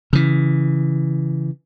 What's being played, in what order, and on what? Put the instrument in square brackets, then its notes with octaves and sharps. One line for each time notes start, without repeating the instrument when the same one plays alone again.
[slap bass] C#3 E3